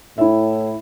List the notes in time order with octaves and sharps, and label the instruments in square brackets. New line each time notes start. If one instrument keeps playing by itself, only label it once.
[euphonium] A2 [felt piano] E4 E5